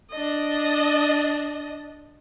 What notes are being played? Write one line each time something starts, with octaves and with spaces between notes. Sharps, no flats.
D4 D#5